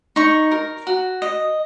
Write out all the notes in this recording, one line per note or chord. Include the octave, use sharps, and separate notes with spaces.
D#4 C#6
A#4
F#4
D#5